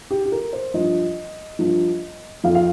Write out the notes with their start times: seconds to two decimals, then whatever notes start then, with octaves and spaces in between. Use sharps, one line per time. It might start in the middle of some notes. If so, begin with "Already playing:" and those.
0.11 G4
0.25 G4
0.32 A#4
0.53 C5
0.74 G2 F3 D#5
1.59 G2 F3
2.44 F2 F3 F5
2.55 F5